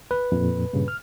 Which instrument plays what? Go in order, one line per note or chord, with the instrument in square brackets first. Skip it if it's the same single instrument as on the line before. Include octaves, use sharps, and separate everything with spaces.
[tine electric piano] B4
[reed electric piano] F2 A#2
G2 A#2 C#3
F6